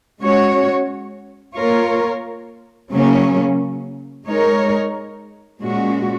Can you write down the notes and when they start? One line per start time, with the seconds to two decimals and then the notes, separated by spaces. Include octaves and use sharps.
0.20 G#3 C#4 F#4 C#5
1.56 A#3 F4 A#4 C#5
2.91 C#3 F#3 A#3 C#4
4.26 G#3 D#4 A#4 C#5
5.62 A#2 G#3 C#4 F#4